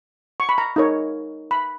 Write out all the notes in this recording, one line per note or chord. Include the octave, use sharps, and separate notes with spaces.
C#6
B5
A#5
D#4 A#4 C#5
B5